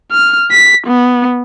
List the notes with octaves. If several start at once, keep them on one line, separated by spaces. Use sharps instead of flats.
F6
B6
B3